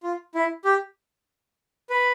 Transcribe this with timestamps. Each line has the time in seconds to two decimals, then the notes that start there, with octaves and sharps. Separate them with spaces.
0.03 F4
0.35 E4
0.65 G4
1.90 B4